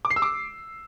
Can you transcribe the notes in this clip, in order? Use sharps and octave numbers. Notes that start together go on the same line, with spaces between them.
D6
C7
E6
D6